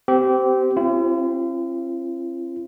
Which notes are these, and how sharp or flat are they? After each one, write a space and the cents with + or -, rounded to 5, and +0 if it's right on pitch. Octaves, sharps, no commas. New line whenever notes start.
C4 -20 G4 -25
C4 +35 F4 -45